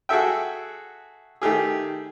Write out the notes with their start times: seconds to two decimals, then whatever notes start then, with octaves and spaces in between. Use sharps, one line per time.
0.09 F#4 G#4 A4 E5 G5
1.42 D#3 A3 G4 G#4